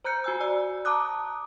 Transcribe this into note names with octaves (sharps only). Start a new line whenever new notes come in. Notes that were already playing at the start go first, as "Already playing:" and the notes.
C5 A#5 F#6 G6 C#7
F#4 G#5 E6
D5 E6
A5 A#5 D6 D#6 F#6